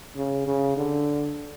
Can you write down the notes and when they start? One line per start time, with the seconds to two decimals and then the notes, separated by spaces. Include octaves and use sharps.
0.16 C#3
0.46 C#3
0.77 D3